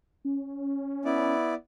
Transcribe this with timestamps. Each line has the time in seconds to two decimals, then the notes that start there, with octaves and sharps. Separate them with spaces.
0.25 C#4
1.05 B3 E4 D5